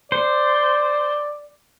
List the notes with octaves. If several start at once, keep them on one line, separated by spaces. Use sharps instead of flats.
C5 D5